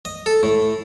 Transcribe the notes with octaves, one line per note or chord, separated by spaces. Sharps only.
D#5
A4
A2